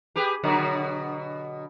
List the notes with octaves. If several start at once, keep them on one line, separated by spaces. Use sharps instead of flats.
G4 G#4 B4
B2 D3 F#3